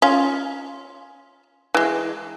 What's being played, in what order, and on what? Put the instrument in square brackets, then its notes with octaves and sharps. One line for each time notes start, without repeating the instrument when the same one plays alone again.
[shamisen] C#4 F4
E3 G#3